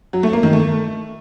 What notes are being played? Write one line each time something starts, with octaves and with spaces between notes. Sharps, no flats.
F#3
A3
A#3
D#3
A3